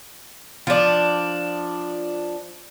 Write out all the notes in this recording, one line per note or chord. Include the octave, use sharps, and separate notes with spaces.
F3 D4